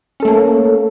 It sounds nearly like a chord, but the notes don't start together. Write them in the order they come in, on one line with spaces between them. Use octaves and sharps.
C#4 A4 A3 A#3